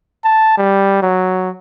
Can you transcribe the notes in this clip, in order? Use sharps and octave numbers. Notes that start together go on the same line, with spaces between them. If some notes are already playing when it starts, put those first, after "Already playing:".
A5
G3
F#3